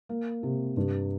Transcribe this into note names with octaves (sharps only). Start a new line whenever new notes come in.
A#3
C3
G2